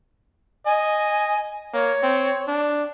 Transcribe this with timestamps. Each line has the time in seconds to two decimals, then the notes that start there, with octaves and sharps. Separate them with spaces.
0.66 D#5 G#5
1.73 A#3 C#5
2.03 C4
2.48 D4